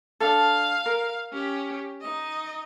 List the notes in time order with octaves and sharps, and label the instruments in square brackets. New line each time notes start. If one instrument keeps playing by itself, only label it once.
[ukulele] D4 A4 [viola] F5
[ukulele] A#4
[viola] C#4 G4
D#4 D#5